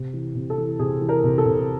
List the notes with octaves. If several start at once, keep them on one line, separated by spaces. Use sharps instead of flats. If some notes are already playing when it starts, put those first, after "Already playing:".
Already playing: C3
E3
C3
A4
E3
C3 G#4
E3
A#4
C3
A4
C3